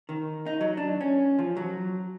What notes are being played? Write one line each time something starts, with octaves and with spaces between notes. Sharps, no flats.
D#3
D#4
F#3
D4
C#4
F3
F#3